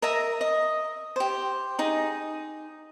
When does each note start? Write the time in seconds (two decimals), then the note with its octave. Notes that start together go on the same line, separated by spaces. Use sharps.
0.02 A#4 D#5 E5 A#5
0.41 D#5
1.16 G4 C5
1.79 D#4 G#4